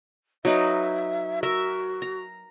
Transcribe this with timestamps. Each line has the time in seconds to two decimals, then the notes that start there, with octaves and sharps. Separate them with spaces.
0.45 F#3 D#4 B4 E5
1.43 F#4 A#4 E5
2.02 A#5